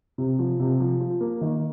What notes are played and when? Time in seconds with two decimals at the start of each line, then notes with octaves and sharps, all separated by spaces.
0.18 C3
0.39 F3
0.60 C3
0.80 F3
1.00 F3
1.21 A#3
1.41 D#3